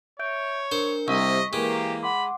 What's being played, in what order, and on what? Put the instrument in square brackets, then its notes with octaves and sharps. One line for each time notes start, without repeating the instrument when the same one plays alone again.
[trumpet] C#5 [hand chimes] E5 G6 D7
[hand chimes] D4 A#4 C#7 [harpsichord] C5
[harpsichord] C2 [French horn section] C3 [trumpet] D#5 [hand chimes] C#6 B6
[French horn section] E3 A#3 [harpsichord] G#3 [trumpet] G4
[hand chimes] F#5 C6 D6 [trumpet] B5